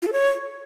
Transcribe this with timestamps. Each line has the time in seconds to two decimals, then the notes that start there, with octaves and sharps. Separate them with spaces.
0.02 F4
0.07 A4
0.12 C#5